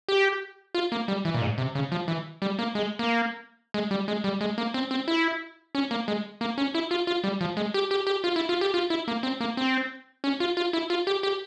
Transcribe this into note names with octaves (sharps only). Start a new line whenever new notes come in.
G4
F4
A#3
G3
E3
A#2
G#2
C3
C#3
F3
E3
G3
A#3
G#3
A#3
G#3
G3
G#3
G3
G#3
A#3
C4
C4
E4
C#4
A#3
G#3
A#3
C#4
E4
F4
F4
G3
F3
G#3
G4
G4
G4
F4
E4
F4
G4
F4
E4
A#3
C4
A#3
C4
C#4
F4
F4
E4
F4
G4
G4